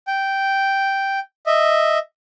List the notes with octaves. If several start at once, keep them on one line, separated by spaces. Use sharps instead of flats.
G5
D#5 E5